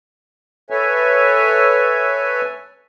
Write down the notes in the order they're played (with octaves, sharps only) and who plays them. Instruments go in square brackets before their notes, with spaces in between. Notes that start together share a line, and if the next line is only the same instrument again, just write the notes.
[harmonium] A4 B4 C#5 E5 G#5